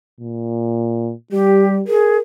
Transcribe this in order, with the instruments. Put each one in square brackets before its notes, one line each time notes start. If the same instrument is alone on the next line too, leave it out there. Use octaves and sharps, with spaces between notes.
[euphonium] A#2
[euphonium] G3 [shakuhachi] G4
[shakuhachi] G#4 [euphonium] A#4